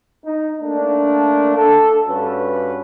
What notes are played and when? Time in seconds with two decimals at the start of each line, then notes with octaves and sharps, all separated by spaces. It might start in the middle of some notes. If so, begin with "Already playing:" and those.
0.24 D#4
0.61 A3 A#3 D4
1.56 A4
2.08 G2 C#4 F#4 B4